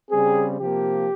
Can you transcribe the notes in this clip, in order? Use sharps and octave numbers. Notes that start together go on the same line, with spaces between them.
C#3 G3 C4 G#4
C3 F3 A#3 G4